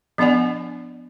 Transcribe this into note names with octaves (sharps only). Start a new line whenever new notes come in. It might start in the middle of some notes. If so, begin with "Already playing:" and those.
F3 B3 D4 D5 F#5 G#5